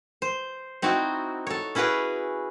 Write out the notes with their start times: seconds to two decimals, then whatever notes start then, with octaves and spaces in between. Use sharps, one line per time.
0.22 C5
0.82 C4 D#4 E4 F#4
1.47 A4 C#5
1.75 C#4 E4 F#4 G#4 B4 C#5